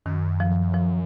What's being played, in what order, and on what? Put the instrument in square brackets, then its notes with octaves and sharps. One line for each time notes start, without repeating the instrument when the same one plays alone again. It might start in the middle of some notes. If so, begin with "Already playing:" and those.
[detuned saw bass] F#2 [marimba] D#3
[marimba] F3
F3